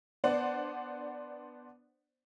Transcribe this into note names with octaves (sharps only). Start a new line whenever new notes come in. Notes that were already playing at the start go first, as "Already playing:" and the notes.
B3 D4 C5 D5 F#5